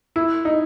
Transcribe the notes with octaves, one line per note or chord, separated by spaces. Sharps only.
E4
D#4